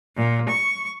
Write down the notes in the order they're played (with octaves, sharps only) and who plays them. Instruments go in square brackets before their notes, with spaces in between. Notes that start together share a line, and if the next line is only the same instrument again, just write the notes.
[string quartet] A#2
C#6